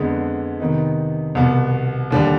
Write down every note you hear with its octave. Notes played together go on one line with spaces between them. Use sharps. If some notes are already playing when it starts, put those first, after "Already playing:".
Already playing: F2 D3 G#3 B3
C3 D#3 B3 D#4
C2 B2 B3
D#2 D3 G3 D4